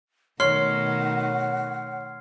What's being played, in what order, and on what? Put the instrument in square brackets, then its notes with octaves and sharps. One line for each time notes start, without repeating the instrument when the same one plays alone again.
[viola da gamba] B2 D#3 A3 [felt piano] C#5 [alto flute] F#5 [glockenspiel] C6 F6 C7